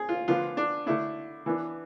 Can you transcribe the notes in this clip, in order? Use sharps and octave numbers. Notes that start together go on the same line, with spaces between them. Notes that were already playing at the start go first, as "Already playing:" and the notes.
Already playing: C4 G#4
F4
D3 F3 B3 F4
D4
D3 A3 D4 E4
E3 B3 D4